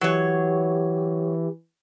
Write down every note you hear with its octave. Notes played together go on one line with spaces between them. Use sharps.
E3 F#3 G4 C#5